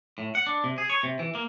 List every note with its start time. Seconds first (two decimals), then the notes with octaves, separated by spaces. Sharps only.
0.18 A2
0.35 F#5
0.47 D4
0.64 C3
0.78 G#4
0.90 C#5
1.03 C3
1.19 E3
1.35 A#3